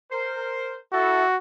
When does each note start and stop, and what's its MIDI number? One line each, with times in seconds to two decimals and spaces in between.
0.11 0.74 70
0.11 0.74 72
0.93 1.23 64
0.93 1.37 66
0.93 1.23 69